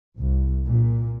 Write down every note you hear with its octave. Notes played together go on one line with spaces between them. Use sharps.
C2
A#2